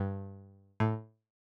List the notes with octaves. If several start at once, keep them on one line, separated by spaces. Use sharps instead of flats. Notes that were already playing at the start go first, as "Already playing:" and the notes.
Already playing: G2
A2